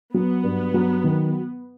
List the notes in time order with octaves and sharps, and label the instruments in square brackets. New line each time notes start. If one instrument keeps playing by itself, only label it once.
[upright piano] F#3 [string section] B3
[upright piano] G2
F#3
D#3